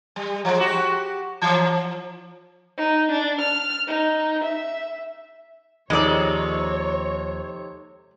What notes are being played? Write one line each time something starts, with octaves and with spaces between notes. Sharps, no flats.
G3
F3 G#3
F#4 G4
E3 F3
D#4
D4
F6
D#4
E5
D#2 C3 F3 G#3 D#4 A4 C#5 D5